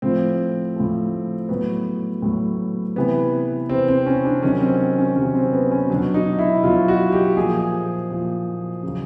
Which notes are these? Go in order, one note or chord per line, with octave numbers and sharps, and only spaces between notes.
A2 F3 C4
A2 F3
A2 F#3 B3
A2 F#3
C3 E3 B3
C3 E3 C4
C4
C#4
D4
C3 D#3 F#3 C#4
C4
C#4
C3 D#3 F#3 C#4
C4
B3
C#4
B2 F#3 D4
D#4
E4
B2 F#3 F4
F#4
G4
A#2 F3 G#4
A#2 F3
C#3 F#3